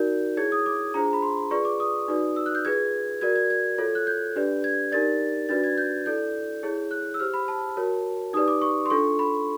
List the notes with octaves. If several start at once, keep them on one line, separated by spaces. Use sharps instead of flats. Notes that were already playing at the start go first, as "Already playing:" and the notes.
Already playing: D#4 F#4 A#4 D5 G6
E4 G#4 C#5 G#6
D#6
D6
D4 F4 G#4 C5 A#5
B5
C6
F4 G#4 B4 D5 C#6
D6
D#6
D#4 F#4 B4 D5
E6
F#6
G6
F4 G#4 B4 G#6
F#4 A#4 D5 G#6
G#6
G#6
F4 A4 C#5
F#6
G6
D4 G4 B4 D5
G#6
D#4 G4 A#4 D5 A6
D4 F#4 B4 D5 A6
G#6
G6
E4 A4 D5 G6
E4 G#4 C#5
F#6
E6
G4 C5 F6
B5
A5
F#4 A#4 C#5
D#4 G4 B4 D5 D#6
D6
C#6
C6
D4 F4 A4 C#6
B5